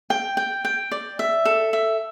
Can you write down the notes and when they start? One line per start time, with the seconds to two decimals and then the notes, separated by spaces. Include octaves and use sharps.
0.10 G5
0.37 G5
0.65 G5
0.91 D5
1.19 E5
1.45 A4
1.73 E5